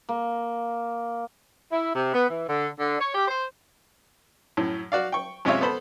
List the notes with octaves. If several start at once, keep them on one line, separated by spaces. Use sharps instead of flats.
A#3
E4
C3
B3
E3
D3
D3
C#5
G4
C5
F#2 A2
F#4 D5 F5
G5 C#6
F#2 C3 G#3 F4 C#5 E5
B3 A4 C5 B5